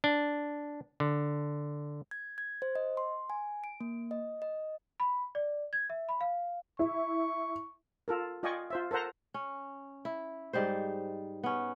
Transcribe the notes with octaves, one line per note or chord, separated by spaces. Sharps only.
D4
D3
G#6
G#6
C5
D#5
C6
G#5
D7
A#3
D#5
D#5
B5
D5
G#6
E5
B5
F5
E4 C#6
F4 A4 A#4
F4 D5 D#5 G5 G#5 C#6
F4 C5 E5
A4 A#4 C5 F#5 A#5
C#4
E4
G#2 G3 D#4 C5
B3 C#4